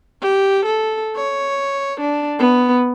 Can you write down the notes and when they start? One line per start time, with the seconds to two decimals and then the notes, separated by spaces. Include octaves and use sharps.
0.22 G4
0.65 A4
1.16 C#5
2.01 D4
2.39 B3